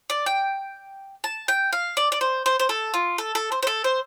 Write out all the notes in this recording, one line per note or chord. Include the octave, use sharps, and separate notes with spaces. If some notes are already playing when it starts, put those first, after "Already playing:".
D5
G5
A5
G5
F5
D5
D5
C5
C5
C5
A4
F4
A4
A4
C5
C5
A4
C5